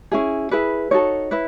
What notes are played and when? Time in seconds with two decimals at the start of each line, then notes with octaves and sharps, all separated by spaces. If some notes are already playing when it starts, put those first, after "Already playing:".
0.12 C#4 E4 G#4
0.51 E4 G#4 B4
0.91 D#4 F#4 A4 C#5
1.31 E4 B4